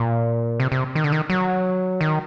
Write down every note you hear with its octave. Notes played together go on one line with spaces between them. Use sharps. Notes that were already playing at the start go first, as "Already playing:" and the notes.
Already playing: A#2
C3
C3
D#3
D3
D#3
F#3
D#3